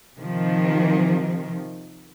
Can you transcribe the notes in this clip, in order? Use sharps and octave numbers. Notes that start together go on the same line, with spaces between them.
C3 D#3 F3